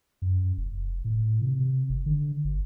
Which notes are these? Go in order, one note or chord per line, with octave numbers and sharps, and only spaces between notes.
F#2
F1
A2
C3
C3
G1
D3
G1